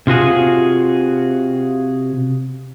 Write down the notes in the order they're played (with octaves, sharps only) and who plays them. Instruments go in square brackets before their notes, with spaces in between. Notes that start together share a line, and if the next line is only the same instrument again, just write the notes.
[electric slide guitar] C3 F4 F#4 G#4